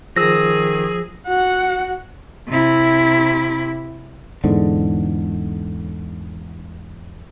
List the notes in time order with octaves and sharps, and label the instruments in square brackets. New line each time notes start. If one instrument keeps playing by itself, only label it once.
[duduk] D#3 [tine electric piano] F3 [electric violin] G#4 [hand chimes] E6 A#6
[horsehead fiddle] F#4 F#5
[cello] C3 E4
[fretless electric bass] E2 G#2 D3